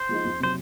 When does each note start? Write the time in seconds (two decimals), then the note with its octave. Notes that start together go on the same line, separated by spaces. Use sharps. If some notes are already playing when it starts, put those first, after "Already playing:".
Already playing: C5
0.09 F3 G#3 D#4
0.25 F2
0.40 C3 F#3 C5